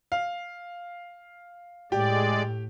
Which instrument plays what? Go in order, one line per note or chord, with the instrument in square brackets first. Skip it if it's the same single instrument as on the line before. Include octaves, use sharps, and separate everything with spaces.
[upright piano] F5
[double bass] A2 [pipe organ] G#3 D5 [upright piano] G4